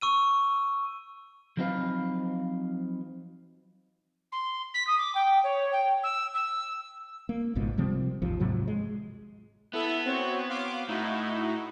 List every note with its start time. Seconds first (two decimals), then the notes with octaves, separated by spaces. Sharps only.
0.01 C#6 E6 D#7
1.57 F3 F#3 C4 D#4 B4 F5
4.32 C6
4.74 B6
4.87 D#6
4.98 D6
5.15 G5
5.43 C#5
5.72 G5
6.03 E6
6.34 E6
7.29 A#3
7.55 G#1 C#2 G#2 B2
7.78 C3 F3 G3 C4
8.22 G#1 D#2 F3
8.40 G#2 C3 F3 F#3
8.68 G#3
9.73 B3 E4 A4 E5
10.06 C4 F#4 C#5
10.50 F5 C6 D6
10.89 A2 D#4 E4 F#4